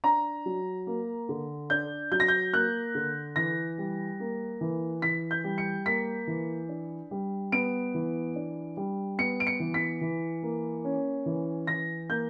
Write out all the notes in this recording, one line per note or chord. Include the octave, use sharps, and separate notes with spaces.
D4 A#5
F#3
A#3
D3
D4 G6
F#3 G6
A#6
G6
A#3 F#6
D3
E3 A#6
G3
A#3
E3
E3 B6
G6
G3
C#7
A#3 B6
E3
D4
G3
B3 D7
E3
D4
G3
B3 C#7
D7
C#7
E3
B6
E3
A#3
C#4
E3
E3 A#6
A#3 G6